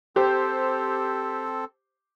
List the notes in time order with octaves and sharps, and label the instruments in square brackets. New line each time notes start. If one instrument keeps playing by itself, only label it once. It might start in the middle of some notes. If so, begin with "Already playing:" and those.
[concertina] C4 A4 [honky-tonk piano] G4 C5